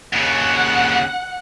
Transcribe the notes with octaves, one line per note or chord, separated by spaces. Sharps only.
D#2 C#3 F#5